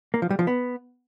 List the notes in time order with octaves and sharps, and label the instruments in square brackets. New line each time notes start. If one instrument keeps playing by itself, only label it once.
[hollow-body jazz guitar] A#3
F3
G3
F3
B3